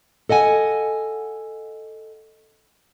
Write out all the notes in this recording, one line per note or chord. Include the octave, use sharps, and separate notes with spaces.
A4 D#5 F#5 G#5